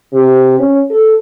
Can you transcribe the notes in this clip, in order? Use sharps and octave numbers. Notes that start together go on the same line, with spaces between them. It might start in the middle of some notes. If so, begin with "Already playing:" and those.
C3
C#4
A4